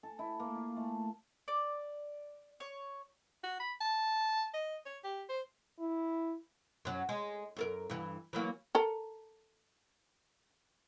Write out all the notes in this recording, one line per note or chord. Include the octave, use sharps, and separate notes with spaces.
A4
E4
A#3
F4
A3
D5
C#5
F#4
B5
A5
D#5
C#5
G4
C5
E4
F#2 F#3
G#3
F#2 A4 A#4
G2 E3
E3 F#3 A#3
A4 A#4